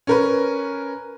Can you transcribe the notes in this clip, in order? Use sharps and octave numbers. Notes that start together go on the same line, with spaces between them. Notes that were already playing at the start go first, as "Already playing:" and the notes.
C#4 A#4 B4